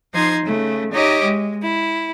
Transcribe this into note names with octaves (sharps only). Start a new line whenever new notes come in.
F3 D#4 C5 C6 G#6
C#3 A3
D#4 G4 C#5 D#5 E5 D6
G#3
E4